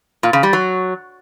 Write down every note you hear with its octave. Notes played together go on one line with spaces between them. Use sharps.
A#2
C#3
G3
F#3